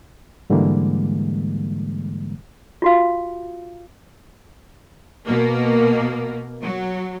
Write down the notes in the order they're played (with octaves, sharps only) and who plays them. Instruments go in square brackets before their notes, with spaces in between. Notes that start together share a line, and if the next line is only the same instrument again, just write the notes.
[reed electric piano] G#2 D3 E3 G3 G#3 A#3
[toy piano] F4 F#4 F5
[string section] B2 A#3
F#3